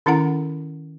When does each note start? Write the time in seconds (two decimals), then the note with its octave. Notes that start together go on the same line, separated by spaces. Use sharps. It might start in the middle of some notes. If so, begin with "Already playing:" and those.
0.06 D#3 C#4 E4 A4 F#5 A#5